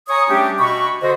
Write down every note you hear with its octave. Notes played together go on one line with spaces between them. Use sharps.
C#5 G#5 A#5 C#6 D#6
G3 A3 C#4 D4 G4
B2 B5 C#6
D3 F#4 C5 D#5